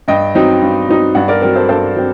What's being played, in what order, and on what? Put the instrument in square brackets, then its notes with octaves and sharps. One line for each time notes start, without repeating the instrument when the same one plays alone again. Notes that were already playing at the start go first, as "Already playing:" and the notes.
[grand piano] G2 D#5 G5
F#3 C4 D#4
G2
F#3 C4 D#4
G2 D5 F#5
A#4 D5
F#3 C4 A#4
A4 C5
G2 A4 C5
F#3 C4